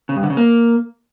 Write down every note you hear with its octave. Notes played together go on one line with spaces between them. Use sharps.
C#3
G2
D3
C#3
A#3